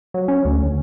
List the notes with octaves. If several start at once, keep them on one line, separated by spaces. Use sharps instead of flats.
F#3
C#4
D2